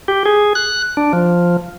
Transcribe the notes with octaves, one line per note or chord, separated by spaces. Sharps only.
G4
G#4
F#6
D4
F3